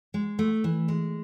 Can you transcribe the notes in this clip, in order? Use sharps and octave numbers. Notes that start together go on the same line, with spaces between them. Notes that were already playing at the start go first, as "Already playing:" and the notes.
G#3
A3
E3
G#3